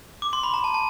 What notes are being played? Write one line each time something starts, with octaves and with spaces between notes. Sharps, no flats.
D6
C6
B5
A#5
A5
A5